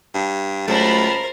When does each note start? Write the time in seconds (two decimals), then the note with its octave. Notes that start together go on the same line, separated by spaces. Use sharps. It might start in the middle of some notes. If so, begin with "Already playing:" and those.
0.15 G2
0.68 C#2 F#3 A3 A#4 C5 A5 B5